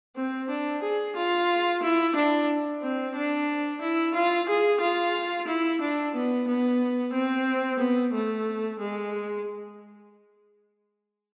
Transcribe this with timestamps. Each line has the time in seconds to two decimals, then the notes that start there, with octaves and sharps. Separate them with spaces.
0.16 C4
0.49 D4
0.83 G#4
1.16 F4
1.83 E4
2.15 D4
2.82 C4
3.16 D4
3.81 E4
4.14 F4
4.48 G#4
4.80 F4
5.47 E4
5.81 D4
6.14 B3
6.47 B3
7.13 C4
7.79 B3
8.13 A3
8.79 G#3